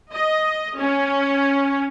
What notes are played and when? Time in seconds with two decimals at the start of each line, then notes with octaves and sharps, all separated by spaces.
0.11 D#5
0.79 C#4